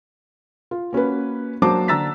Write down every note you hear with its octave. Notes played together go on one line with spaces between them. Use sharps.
F4
A#3 C#4 F#4 B4
F#3 A#3 D4 C5 A5 D6
D3 D4 A#5 E6 A6 B6